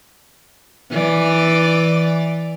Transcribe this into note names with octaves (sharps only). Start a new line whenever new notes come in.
E3 D5